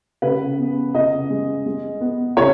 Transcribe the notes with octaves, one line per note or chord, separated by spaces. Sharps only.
C#3 B4
B3
C#3 D#5
G#3
G#3
B3
C#3 C#5